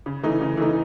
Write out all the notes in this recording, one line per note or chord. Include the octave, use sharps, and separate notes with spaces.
C#3
E3 A3 D#4
C#3
E3 A3 D#4